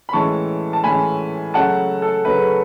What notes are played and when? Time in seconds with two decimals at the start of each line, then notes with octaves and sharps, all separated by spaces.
0.09 B5
0.13 A2 E3 G#3 C#4 A5 C#6
0.73 A5
0.83 A2 E3 G#3 C#4 G#5 B5
1.54 C#3 F#3 A3 C#4 F#5 A5
2.02 A4
2.25 C#3 F#3 A3 C#4 B4